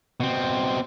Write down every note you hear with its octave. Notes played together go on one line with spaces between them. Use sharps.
B2 C4